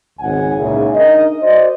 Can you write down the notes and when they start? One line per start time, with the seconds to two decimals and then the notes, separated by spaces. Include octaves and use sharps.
0.20 G#1 C#2 C#3 F#5 G#5
0.58 C#2 A#2 C#3 D#4 E4 G#4
0.94 D4 D#4 A#4 D#5
1.42 F#4 C5 D5 D#5